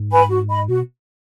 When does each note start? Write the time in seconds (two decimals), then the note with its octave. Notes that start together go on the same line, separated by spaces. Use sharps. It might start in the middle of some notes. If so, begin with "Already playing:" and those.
Already playing: G#2
0.11 B4 G#5 B5
0.29 F#4
0.49 D#5 B5
0.68 B2 F#4